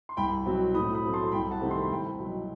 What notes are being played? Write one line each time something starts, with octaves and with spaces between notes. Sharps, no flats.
C6
C2 G5 B5
B2 F#3 C4
A2 B5 D#6
B5 D#6
F#3 A3 C4
A5 C6
C2 G5 B5
F#5 A5
C3 D#3 A3 C4
C6
B5
A5
C2 G5 B5
B2 F#3